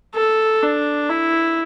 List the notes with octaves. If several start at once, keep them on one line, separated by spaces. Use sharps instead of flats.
A4
D4
E4